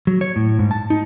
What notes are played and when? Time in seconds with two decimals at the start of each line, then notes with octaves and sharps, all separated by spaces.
0.07 F#3
0.21 C#5
0.36 A2
0.59 G#2
0.71 A5
0.90 D#4